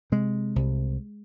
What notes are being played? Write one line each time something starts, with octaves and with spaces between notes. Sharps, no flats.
C3 G#3
C2